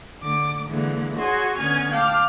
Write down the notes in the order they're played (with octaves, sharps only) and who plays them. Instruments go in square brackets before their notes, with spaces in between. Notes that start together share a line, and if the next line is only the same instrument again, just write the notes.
[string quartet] D3 D6
D3 E3 G#3 A#3
F#4 G#4 C#5 G#5 C6
D3 B3 C#4 G#5 F6 G#6
F5 G5 A5 D6 F6